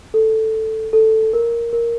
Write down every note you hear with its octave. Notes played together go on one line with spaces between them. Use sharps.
A4
A4
A#4
A#4